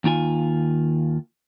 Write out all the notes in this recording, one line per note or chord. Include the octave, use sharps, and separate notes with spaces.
D#2 D#3 F4 G#5